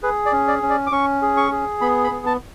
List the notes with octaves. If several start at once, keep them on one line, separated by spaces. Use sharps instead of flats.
G#4 B4
D5
C#4
D5
C#4
D5
D6
C#4 C#6
G#4
C#6
G#4
B3 B5
B5
B3
A5